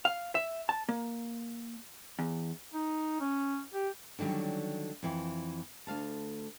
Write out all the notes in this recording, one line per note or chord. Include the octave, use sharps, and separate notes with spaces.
F5
E5
A5
A#3
E2
D#4
C#4
G4
D3 D#3 F#3 G3 C#4
F2 E3 E5
D2 F5 A5